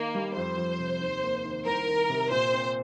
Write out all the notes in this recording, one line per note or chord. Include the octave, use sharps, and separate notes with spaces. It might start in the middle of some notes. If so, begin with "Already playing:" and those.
Already playing: D#3 A#3 D#4
G3
F2 C5
F3
C3
D#2
A#3
D#3
C2 A#4
D#3
C3
A#2 C5
C4